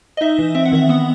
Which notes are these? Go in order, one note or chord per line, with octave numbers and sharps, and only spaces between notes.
D#5
D#4 E5
E3
C4 E5
F#5
D#3 E5
B3 F#5